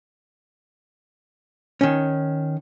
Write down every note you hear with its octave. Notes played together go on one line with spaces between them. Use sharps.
D#3 C#4